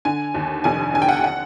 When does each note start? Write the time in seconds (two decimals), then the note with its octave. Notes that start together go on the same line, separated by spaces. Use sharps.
0.05 D3 G#5
0.34 D#2
0.64 F1 G#5
0.94 D3 G#5
1.02 G5
1.09 F#5
1.17 G5
1.24 F#5